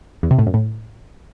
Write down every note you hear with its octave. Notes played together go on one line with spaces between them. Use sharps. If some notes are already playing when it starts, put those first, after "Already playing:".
E2
C3
A2
F#2
A2